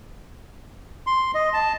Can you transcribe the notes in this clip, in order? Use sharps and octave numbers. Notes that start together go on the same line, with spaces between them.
C6
D#5
A5